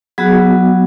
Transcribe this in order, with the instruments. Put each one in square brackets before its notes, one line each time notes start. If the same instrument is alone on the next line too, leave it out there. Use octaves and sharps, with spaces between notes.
[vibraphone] F#3 B3 F#4 G#4